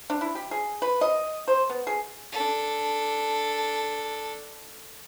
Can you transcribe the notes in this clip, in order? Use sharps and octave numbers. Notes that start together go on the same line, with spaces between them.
D4
E4
G4
G#4
B4
D#5
C5
B3
G#4
D4 A4